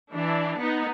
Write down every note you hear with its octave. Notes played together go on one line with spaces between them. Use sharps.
E3 D4
B3 D#4